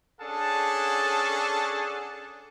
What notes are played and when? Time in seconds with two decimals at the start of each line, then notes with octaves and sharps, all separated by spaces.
0.21 C#4 D4 G#4 A4 F#5 A5